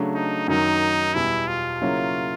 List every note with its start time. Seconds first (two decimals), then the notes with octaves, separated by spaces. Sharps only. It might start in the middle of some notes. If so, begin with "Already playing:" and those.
Already playing: C#3 F#3 A3 D4
0.15 D#4
0.48 F#2 D#3 F#3 D#4
1.14 E2 B2 G3 E4
1.48 F4
1.82 C#3 F#3 A#3 C#4 E4